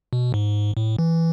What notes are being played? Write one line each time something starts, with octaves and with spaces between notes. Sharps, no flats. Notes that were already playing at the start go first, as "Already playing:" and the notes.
B2
G#2
A2
E3